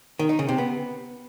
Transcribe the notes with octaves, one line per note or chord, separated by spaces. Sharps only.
D#3
D#4
C#3
C3
B3